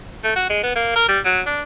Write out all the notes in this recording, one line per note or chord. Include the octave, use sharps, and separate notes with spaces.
A3
F#4
G#3
B3
A#3
A#4
G3
F#3
D4